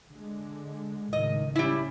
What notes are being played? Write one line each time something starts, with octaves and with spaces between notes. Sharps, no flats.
D3 G#3
C#2 A2 D#3 D#5
G3 C#4 E4